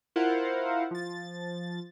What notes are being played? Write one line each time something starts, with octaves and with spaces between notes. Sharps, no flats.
E4 F4 A#4 C5 F5 F#5
F3 A6